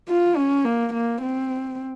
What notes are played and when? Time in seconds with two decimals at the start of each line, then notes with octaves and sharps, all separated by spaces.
0.09 F4
0.36 C#4
0.65 A#3
0.94 A#3
1.21 C4